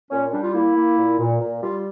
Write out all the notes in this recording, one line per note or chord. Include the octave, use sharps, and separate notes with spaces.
A#2 C#4
G3 D4
F4
A#3 E4
A#3
A#2
A#2
A#2
G3 F4